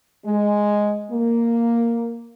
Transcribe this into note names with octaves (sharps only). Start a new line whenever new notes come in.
G#3
A#3